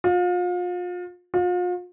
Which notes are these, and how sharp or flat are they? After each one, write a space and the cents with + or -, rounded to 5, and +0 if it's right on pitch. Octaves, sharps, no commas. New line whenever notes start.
F4 +35
F4 +40